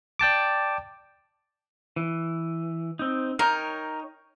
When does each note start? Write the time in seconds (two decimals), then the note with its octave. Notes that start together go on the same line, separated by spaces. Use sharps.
0.19 D5 G5 A5 D6
1.96 E3
2.99 C4 D#4
3.39 D#4 A#4 C#5 G5